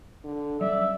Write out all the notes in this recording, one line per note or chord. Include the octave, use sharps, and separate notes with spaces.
D3
F#3 G3 C#4 D5 E5